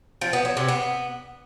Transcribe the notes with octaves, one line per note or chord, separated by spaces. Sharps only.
F3
B3
F#3
C3
B3